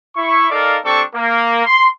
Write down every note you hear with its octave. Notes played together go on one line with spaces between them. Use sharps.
E4 C#6
D#4 A4 A#4 D5 F5
G3 C4 D4 A4 D5 C#6
A#3
C6